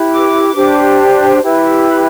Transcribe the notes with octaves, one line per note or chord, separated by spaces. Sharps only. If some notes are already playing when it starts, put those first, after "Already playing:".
Already playing: E4 G4 B4
D6
D4 G4 C5
E4 G4 B4